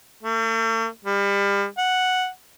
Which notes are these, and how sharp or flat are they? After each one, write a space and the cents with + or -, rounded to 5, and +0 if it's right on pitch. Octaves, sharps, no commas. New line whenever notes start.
A3 +45
G3 +35
F#5 +0